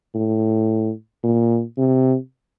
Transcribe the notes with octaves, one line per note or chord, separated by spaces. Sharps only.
A2
A#2
C3